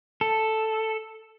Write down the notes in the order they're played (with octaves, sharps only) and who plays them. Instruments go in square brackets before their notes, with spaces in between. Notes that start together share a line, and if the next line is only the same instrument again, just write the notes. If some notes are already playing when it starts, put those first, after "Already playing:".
[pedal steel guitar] A4